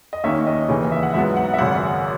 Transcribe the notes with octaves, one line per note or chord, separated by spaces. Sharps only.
D#5
D#2 D#3 A#3 C#4 E5
D#5
D#2 C#3 E3 C#5
D#5
E5
F#5
G#2 F#3 B3 E5
F#5
E5
G#1 F#2 C#3 F#5